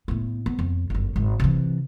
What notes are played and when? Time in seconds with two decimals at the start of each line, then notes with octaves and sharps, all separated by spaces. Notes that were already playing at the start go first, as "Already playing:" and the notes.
0.08 A2 B3
0.46 B3
0.59 F2
0.90 G1 F#2
1.16 G#1
1.40 C3 E3